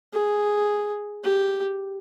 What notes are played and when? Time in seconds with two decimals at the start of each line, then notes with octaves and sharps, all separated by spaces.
0.14 G#4
1.24 G4